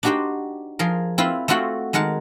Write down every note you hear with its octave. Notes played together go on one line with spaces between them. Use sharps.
D4 D#4 F#4 G4 C5 G5
F3 G#4 A#4
C4 E4 F4 B4
A3 C4 F4 F#4 F#5 G5
D#3 G#3 A#4 F#5 A5